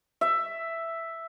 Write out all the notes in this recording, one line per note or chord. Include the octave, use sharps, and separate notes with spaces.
E5